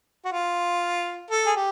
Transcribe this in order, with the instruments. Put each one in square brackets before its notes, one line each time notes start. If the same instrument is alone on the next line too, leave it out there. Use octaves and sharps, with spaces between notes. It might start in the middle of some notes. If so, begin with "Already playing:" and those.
[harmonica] F#4
F4
A4
G#4
G4